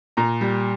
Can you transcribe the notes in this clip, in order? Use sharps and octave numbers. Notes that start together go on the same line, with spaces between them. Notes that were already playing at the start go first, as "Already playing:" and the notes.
A#2 A#5
G3